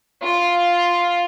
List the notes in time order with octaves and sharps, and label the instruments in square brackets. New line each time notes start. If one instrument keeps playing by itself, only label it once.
[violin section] F4